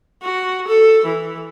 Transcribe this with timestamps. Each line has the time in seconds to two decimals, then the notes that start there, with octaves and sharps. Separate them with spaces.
0.23 F#4
0.68 A4
1.05 E3